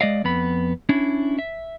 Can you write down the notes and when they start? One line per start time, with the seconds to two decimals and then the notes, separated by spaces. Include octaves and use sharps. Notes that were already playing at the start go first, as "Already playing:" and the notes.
0.01 G#3 D5 D#5 F5
0.24 F2 B3 B5
0.89 C#4 D4 E4
1.39 E5